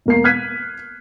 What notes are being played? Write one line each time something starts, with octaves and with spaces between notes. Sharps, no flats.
E1 A#3 C7
F6 F#6 G#6 B6 D#7